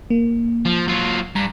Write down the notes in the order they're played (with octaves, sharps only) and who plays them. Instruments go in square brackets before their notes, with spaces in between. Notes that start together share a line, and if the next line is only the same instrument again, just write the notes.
[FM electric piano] A#3
[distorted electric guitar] F3
F#3 F4
[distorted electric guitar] G2 [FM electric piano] A#5